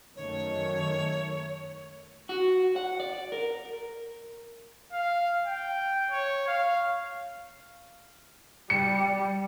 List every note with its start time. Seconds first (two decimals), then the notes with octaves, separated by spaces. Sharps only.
0.16 F#2 D#3 A3 C#5
2.29 F#4
2.76 F#5
3.00 D5
3.32 A#4
4.93 F5
5.46 G5
6.11 C#5
6.48 F5
8.70 G3 C#7